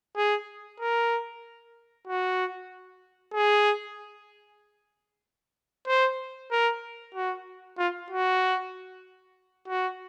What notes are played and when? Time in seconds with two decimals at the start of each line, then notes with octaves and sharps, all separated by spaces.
0.17 G#4
0.80 A#4
2.08 F#4
3.34 G#4
5.88 C5
6.51 A#4
7.15 F#4
7.78 F4
8.10 F#4
9.68 F#4